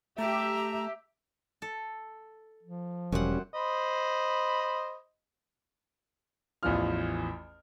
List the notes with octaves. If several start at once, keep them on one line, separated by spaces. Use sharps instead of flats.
A3 G4 E5 A#5
A4
F3
E1 F#2 G3 C#4 C5 F#5
C5 D#5 B5
A1 E2 E3 F3 F4 F6